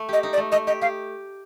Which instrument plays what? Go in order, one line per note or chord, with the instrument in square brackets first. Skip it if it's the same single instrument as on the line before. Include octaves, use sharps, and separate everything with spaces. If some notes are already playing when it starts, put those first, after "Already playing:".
Already playing: [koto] A3
[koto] G4 [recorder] D#5
[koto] D#4
[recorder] D5
[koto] A3
[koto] A3 [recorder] D#5
[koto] G4 [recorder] D#5
[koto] G4 [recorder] F5